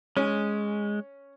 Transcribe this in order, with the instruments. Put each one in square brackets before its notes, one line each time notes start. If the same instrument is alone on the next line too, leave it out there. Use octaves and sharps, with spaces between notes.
[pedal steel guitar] G#3 [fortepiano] C#4